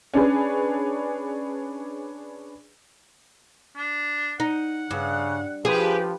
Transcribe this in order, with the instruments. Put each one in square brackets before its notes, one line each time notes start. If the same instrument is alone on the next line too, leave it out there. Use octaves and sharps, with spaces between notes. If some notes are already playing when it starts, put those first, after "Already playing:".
[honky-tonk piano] C#4 D4 G#4 B4
[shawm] D4
[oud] D#4 [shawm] F#5
[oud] G2 [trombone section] C#3
[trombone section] F3 [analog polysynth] G4 B4 [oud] G#4